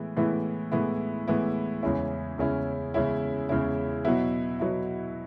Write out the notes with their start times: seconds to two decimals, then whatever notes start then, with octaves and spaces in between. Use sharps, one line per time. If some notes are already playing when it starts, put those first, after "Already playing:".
Already playing: A2 E3 G#3 B3 E4
0.17 A2 E3 G#3 B3 E4
0.72 A2 E3 G#3 B3 E4
1.27 A2 E3 G#3 B3 E4
1.82 E2 C#3 G#3 C#4 E4
2.38 E2 C#3 G#3 C#4 E4
2.94 E2 C#3 G#3 C#4 E4
3.49 E2 C#3 G#3 C#4 E4
4.05 B2 F#3 B3 E4
4.60 B2 F#3 B3 E4